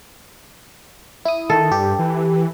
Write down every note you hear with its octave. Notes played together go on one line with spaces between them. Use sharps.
E4 D#6
D#3 A4
G2 G4
E3